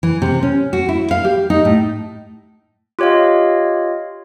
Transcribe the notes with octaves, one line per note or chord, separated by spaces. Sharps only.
E3
C3
C#4
F#4
E4
F5
G4
D#4
A2
F4 G4 C#5 D#5 F5